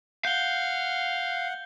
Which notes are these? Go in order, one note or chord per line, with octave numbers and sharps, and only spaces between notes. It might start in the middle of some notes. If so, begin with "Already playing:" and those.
F5 F#5 G6 G7